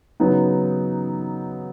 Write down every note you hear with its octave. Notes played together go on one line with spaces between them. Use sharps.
C#3 F#3 B3 D#4